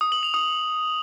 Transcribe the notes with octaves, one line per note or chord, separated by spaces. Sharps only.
D#6
F#7
F7
D#6